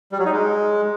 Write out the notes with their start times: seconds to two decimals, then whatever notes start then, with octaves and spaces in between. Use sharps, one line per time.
0.12 G3
0.19 F#3
0.25 D#4
0.32 G#3